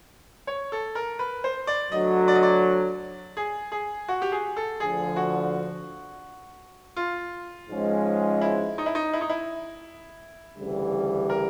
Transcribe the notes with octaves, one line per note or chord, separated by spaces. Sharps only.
C#5
A4
A#4
B4
C5
D5
D2 D3 F#3 D#5
D5
D#5
D5
G#4
G#4
F#4
G4
G#4
A4
D2 D3 F3 G#4
F#4
F4
G#2 F3 G#3 C#4
E4
D#4
E4
D#4
E4
D#4
E4
D2 C#3 E3 G3
A#4